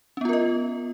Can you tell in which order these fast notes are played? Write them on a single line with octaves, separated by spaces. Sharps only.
C#4 B3 F4 A#4 D#5